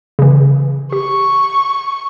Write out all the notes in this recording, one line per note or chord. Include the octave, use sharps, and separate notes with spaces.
C#3 E3
G4 C#6